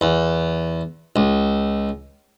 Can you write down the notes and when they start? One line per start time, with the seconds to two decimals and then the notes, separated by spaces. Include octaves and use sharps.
0.01 E2
1.16 C#2